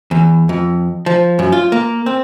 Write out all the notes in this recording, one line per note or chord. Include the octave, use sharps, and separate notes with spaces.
E2
F2
F3
F#2
F4
A#3
C4